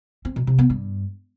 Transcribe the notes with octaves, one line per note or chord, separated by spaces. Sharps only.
C4
B2
C3
B3
G2